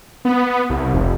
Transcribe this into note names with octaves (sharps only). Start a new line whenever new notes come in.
B3
C2
F1